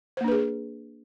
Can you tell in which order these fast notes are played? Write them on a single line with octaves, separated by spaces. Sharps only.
C5 A#3 D4 B4 G#4